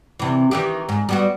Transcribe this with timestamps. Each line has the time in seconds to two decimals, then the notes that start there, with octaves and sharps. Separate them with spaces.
0.19 C3 E3
0.51 D#3 E3 G4
0.89 G#2
1.09 G3 B3 F#4